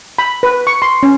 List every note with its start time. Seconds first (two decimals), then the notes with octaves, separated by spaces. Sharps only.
0.19 B5
0.43 B4
0.67 C#6
0.82 C6
1.03 C#4